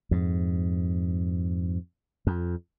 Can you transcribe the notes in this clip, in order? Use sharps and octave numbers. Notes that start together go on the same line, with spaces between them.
F2 G#2
F2